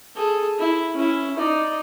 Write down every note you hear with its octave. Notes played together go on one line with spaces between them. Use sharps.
G#4 A4
E4
C#4 E4
D#4 D5